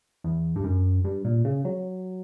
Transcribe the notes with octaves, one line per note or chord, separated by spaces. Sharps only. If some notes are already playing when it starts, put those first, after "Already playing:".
E2
G2
F#2
G2
A#2
C#3
F#3